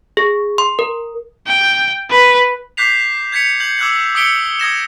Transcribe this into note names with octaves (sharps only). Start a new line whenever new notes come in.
G#4
C6
A#4
G5
B4
D6 F#6 G6 B6 C7 F7
G6 G#6 B6 C#7 F7
G6 F#7
D6 E6 F#6 G#6 F#7
D#6 E6 B6 C#7 D7 G7
D#6 G#6 A#6 E7